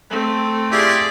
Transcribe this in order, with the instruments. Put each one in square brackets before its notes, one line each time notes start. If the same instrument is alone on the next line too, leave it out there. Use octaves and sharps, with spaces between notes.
[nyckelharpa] A3 C4
[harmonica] E4 F4 G4 [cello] G#4 D5